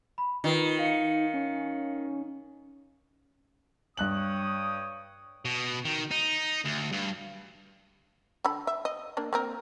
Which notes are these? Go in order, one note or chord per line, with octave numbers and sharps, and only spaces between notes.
B5
D#3 F4 B4 C7
D#4 F5 C#7
C#4
G2 C#5 G5 D#6 F#6 F#7
B2
D#3
D#4
D2
G2
D3 A4 B5
E5
D#5
A#3 D4
A#3 C4 A#4